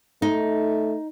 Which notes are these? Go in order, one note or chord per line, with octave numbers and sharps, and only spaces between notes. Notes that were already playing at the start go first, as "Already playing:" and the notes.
A3 D#4